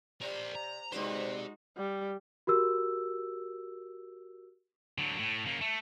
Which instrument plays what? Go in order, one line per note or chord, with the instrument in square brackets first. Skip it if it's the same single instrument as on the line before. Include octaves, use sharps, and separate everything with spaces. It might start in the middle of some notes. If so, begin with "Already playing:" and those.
[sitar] C3 [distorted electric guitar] A#4 C5 [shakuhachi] D5
[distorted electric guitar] A#5
[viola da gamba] G#3 D#4 F#4 [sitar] C4 B4 [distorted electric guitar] G4 C5 [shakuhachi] D5
[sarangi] G3
[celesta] F#4 G4 A#4 E6
[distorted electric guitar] D3 F#3
A2
C#3 A#3
A3